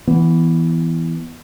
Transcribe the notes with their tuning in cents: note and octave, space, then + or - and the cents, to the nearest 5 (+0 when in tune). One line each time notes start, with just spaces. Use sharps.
E3 +0 B3 +0